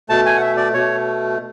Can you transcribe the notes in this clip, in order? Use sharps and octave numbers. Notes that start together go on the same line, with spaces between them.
B2 A3 A5
G#5
F#5
E5
D5
B2 A3 C#5